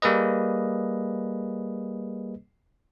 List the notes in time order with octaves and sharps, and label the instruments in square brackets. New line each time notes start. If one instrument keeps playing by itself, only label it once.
[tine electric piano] G3 A#3 G#4 B4 D#5